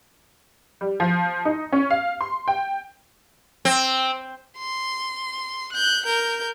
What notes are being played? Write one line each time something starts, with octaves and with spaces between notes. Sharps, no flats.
G3
F3
D#4
C#4
F5
C6
G5
C4
C6
F#6 G6
A#4 G6